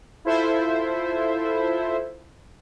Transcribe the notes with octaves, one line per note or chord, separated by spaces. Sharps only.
E4 F4 A4 C5 E5